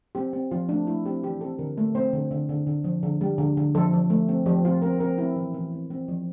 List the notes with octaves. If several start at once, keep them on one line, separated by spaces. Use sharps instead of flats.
C4 G4
C4
F3 F4
A3 D4
A3 E4
C4 G4
E3 G4
C4 A4
D3 A#4
A3
C4 C5
D3
D3
D3
D3
F3
D3
G3
D3
D3
F3 A4
F3
A3
C4
F3 G4
C4 F4
C4 A#4
C4 A#4
C4 E4
E3
E3
C4
C4
F3